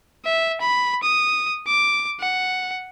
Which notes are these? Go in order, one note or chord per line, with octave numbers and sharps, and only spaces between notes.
E5
B5
D#6
D6
F#5